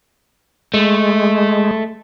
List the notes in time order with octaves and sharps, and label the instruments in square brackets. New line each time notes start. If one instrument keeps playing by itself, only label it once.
[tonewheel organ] G#3 [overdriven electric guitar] A3